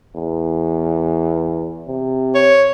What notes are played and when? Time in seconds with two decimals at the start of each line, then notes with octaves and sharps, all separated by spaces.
0.15 E2
1.88 C3
2.35 C#5